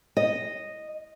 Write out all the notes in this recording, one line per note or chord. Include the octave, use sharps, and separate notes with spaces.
D#5